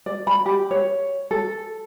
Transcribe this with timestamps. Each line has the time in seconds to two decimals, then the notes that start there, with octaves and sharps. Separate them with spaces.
0.06 D5
0.27 B5
0.46 G4
0.71 C#5
1.31 A4